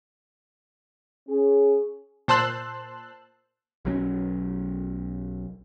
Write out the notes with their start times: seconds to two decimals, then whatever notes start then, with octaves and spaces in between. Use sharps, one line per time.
1.29 C#4 G#4
2.28 A#2 C5 A5 C6 E6 F#6
3.85 B1 F#3 C4 C#4